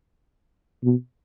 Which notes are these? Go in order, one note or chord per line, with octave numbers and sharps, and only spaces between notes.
B2